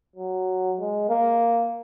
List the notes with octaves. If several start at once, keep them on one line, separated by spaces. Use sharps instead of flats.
F#3
G#3
A#3